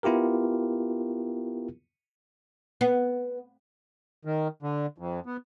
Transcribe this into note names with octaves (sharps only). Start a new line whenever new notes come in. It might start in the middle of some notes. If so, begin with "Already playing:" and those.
B3 E4 F4 G4 A#4
B3
D#3
D3
F2
B3